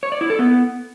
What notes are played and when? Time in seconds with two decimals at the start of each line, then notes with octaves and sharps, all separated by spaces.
0.03 C#5
0.12 D5
0.21 E4
0.30 A4
0.39 B3